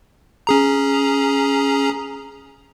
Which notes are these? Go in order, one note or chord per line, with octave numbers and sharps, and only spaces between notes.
C#4 G#4 A#5